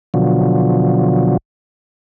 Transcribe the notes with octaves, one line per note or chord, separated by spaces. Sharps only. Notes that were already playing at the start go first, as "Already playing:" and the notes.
B2 D3 F3 F#3